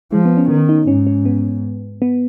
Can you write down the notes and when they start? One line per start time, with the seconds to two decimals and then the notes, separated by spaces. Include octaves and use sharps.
0.12 F3 G#3
0.25 B3
0.37 C#4
0.50 D#3 B3
0.69 D#4
0.87 G#2 C#4
1.07 C#4
1.25 B3
2.02 B3